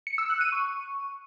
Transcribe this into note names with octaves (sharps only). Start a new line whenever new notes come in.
C#7
E6
F#6
D#7
C#6